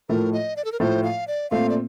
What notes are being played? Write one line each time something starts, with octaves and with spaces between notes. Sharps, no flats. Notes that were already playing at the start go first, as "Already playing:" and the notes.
A2 F3 A3 A#4
D#5
D5
A4
A#4
A2 F3 A3 C5
F5
D5
A#2 A3 C4 F5
D5